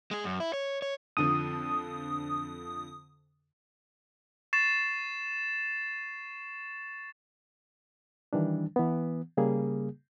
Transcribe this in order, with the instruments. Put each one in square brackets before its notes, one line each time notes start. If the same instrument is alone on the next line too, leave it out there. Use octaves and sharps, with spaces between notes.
[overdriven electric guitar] G#3 G#4
F#2
E4
C#5
C#5
[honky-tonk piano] F2 D3 F3 [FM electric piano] D#6
[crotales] C#6 A6 C7 E7
[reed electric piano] D#3 E3 G3 D4
E3 B3
C#3 G3 A#3 G#4